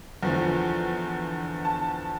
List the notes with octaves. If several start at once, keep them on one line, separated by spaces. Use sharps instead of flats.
E2 D3 F3
A5